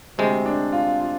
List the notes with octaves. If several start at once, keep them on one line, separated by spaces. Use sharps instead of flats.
D2 C3 G#3 C4
D4
F4
F4